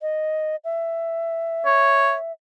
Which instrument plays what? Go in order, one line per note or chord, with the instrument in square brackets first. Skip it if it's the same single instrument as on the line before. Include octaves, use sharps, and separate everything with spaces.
[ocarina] D#5
E5
[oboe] C#5